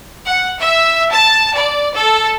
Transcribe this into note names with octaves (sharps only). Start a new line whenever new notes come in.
F#5
E5
A5
D5
A4